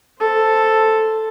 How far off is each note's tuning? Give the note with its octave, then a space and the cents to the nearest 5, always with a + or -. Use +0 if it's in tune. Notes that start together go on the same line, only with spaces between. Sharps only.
A4 +0 C5 +0